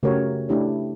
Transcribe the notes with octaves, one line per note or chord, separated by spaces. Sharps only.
C#3 A3 F#4 G4 A#4 C#5
A3 D4 E4 G4 C#5